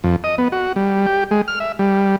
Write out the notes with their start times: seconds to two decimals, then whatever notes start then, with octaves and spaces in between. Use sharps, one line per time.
0.04 F2
0.24 D#5
0.38 B3
0.52 F#4
0.76 G3
1.06 G4
1.31 G#3
1.48 F6
1.60 E5
1.79 G3